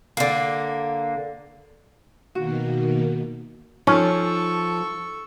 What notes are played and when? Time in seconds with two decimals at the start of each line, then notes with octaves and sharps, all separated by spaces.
0.17 D3 A#3
2.35 B2 D#3 A#3 F#4
3.87 F3 C#4 D#4 A4 C#6